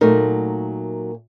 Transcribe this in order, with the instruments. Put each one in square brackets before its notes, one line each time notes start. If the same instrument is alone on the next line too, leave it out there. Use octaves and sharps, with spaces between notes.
[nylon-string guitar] A#2 F#3 A3 D#4 A#4